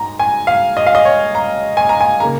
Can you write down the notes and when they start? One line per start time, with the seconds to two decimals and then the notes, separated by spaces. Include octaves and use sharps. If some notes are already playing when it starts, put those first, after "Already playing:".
Already playing: G#2 G#3 A#5
0.19 G#5
0.47 F5
0.77 D#5
0.86 F5
0.95 D#5
1.05 C#5
1.35 A#5
1.77 G#5
1.89 A#5
2.01 G#5
2.20 C#3 A#3 A#5